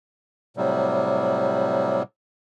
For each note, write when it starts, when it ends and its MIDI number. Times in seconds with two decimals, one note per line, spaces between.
0.57 2.03 45
0.57 2.03 48
0.57 2.03 54
0.57 2.03 55